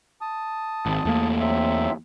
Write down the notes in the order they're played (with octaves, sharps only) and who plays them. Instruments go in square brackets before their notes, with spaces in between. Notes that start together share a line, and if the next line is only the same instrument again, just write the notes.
[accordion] A5 D#6
[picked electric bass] G#1
E2 A3 A#3
[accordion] F#3 C4 E5